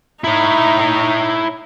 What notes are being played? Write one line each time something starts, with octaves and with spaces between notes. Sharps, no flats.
D#4 E4 C#5